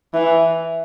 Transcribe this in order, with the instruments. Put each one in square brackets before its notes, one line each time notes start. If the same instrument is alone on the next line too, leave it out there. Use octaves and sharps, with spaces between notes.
[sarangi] E3